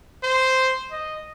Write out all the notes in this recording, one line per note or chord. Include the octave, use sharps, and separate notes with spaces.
C5
D#5